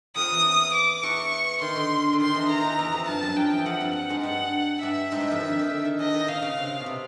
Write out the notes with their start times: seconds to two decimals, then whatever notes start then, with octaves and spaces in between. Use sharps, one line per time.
0.16 F2 F3 D#6
0.31 E2 E3
0.74 D6
1.03 E2 E3 C#6
1.61 D#3 C6
1.76 D3
2.13 D3
2.20 D#3 C6
2.34 E2 E3
2.49 D#3 A#5
2.64 E2 E3
2.79 E2 E3
2.92 F2 F3
3.07 G2 G3 A5
3.22 F#2 F#3
3.36 F2 F3 G5
3.51 E2 E3
3.65 F2 F3 F#5
3.80 G2 G3
3.95 F#5
4.09 G#2 G#3
4.23 G2 G3 F#5
4.83 G2 G3 E5
5.11 G#2 G#3
5.20 G2 G3
5.31 F2 F3
5.40 D#3
5.59 D#3
5.70 D3
5.85 D#3
5.99 E2 E3 D#5
6.13 D#3
6.28 C#3 F5
6.42 C#3
6.57 C3
6.80 B2
6.86 C3